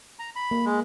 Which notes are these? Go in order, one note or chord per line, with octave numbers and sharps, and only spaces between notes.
A#5
B5
A#3
G#3